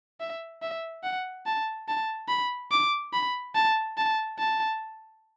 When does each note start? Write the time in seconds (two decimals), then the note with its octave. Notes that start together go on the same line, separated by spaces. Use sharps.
0.20 E5
0.62 E5
1.03 F#5
1.46 A5
1.88 A5
2.29 B5
2.72 D6
3.13 B5
3.55 A5
3.97 A5
4.39 A5